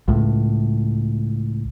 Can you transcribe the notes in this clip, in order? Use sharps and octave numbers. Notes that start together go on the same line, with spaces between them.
C#2 A2